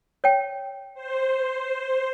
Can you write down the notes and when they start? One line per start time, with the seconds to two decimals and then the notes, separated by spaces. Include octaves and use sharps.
0.24 C#5 G5
0.94 C5